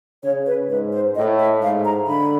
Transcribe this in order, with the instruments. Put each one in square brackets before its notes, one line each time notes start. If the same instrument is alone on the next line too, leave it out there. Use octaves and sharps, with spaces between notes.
[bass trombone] C#3 [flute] C#5
[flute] B4
[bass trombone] G#2 [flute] B4
[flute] C5
[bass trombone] A2 [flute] D#5
[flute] E5
[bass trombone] G#2 [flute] F5
[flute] A#5
[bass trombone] D3 [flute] B5